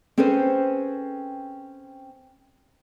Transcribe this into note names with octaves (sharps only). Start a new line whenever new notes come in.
C4 C#4 G#4 A4 B4 C5